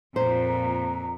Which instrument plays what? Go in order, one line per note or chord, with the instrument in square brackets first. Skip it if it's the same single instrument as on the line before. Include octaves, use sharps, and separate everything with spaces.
[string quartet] F2 [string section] A#2 [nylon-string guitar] C5 [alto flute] A#5